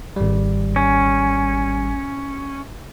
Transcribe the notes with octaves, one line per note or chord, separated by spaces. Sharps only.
G#1 G3
C#4